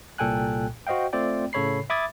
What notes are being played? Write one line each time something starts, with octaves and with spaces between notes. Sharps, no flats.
C2 A#2 A4 G5 G#5 F#6
F#4 C5 D#5 F5 G5
A3 C4 F4 D5 G5
A2 C#3 A4 C#5 B5 C7
E5 B5 D6 D#6 G#6 A6